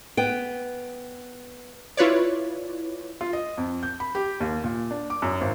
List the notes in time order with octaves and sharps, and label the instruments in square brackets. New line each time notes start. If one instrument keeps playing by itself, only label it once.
[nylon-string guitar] B3 G5
[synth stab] E4 F4 B4 C#5 D5
[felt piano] F4
D#5
F2
G6
B5
G4
D#2
A#2
D4
D6
F#2
G#1